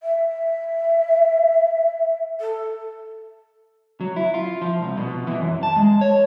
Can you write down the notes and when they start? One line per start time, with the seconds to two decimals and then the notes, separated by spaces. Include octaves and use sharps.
0.03 E5
2.40 A4
4.01 F#3
4.16 E4
4.34 F4
4.62 F3
4.82 C2
4.97 B2
5.27 E3
5.40 F#2
5.63 A5
5.76 G#3
6.01 C#5